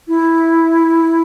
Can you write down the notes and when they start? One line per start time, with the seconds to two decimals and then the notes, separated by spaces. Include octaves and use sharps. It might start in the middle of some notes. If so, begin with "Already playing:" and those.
0.08 E4